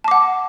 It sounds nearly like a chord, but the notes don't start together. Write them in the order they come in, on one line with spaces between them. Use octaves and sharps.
A5 D6 F#5